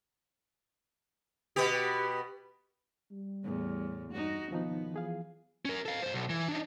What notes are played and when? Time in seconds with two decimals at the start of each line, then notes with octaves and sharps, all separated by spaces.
1.56 B2 B3 G4
3.11 G3
3.44 E2 A2
4.11 G2 D#4 F#4
4.51 B1 D#3 F3 B3 D#4
4.94 E3 F3 G#4 F5
5.65 C#4 A#4
5.86 A4 F5
6.02 G2 C5
6.14 B1
6.30 E3
6.49 D4 D#4